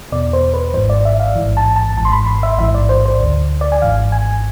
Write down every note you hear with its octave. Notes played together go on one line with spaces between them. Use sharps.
E2 B2 D5
C5
B4
G#1 G#2 E3 C5
D5
E5
F5
A1 G#2 E3
A5
A5
G#1 G#2 E3 A5
C6
B5
C6
E5
A1 G#2 E3 E5
D5
C5
C5
D2 D3
D5
G#5
G#1 G#2 E3 F5
G#5